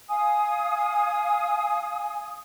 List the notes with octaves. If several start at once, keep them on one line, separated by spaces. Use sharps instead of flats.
F5 G#5 D#6